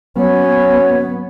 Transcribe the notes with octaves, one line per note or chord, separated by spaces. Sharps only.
F#3 B3 C#4 C#5